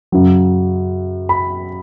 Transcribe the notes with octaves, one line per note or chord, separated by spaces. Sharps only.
F#2 C#3 F#3
B5